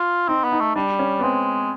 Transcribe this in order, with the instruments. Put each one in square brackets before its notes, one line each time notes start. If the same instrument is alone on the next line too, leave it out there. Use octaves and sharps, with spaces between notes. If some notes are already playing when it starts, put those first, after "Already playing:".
Already playing: [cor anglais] F4
[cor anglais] C4 [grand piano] D#4
[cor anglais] B3
[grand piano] D#4
[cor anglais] A3
[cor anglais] G3 [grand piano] D4
[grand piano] C#4
B3
[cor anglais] G#3 [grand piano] C4